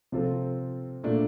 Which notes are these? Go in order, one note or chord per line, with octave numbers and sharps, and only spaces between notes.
C3 F3 C4 F4 A4
A#2 A3 D4